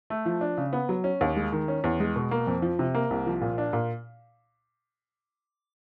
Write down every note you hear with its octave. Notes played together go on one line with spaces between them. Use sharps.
A3
F3
D4
C#3
B3
F#3
C#4
D#2
G#3
D#3
C#4
E2
G#3
B2
A#3
F2
F3
C3
A#3
C2
F3
A#2
D4
A#2